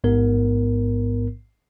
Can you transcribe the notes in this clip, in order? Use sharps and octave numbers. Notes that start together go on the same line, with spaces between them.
A1 G#2 B3 A#4